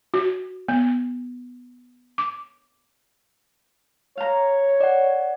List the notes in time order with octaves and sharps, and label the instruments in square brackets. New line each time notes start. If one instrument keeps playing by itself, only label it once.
[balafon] F#4
B3
D6
[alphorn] C#5 [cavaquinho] F5 A#5
[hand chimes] D5 F#5